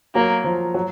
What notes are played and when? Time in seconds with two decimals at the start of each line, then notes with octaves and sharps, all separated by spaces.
0.15 F#3 A#3
0.44 F3
0.74 F#3